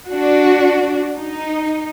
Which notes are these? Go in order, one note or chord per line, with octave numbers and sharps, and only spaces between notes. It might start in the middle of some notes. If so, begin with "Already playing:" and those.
D4 F#4
D#4